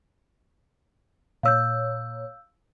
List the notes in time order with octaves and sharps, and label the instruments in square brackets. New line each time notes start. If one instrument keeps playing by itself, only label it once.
[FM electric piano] A#2 C#5 [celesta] F5 E6 G6